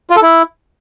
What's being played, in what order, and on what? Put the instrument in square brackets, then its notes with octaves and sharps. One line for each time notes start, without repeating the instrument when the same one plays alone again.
[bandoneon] F4
A4
E4